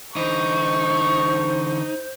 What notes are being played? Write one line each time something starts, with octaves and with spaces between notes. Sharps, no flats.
D3 E3 D#4 C5 C#6